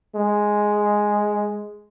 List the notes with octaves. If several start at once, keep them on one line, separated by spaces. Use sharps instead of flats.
G#3